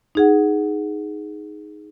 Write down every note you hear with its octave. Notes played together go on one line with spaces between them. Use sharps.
D#4 G#4 F#5